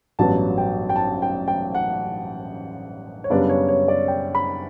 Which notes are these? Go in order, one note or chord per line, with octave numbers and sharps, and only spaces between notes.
A1 G2 F#3 B3 A5
G5
G5
A5
G5
G5
F#5
C#5
F#2 C#3 G3 B3 D4 D5
C#5
C#5
D5
G5
B5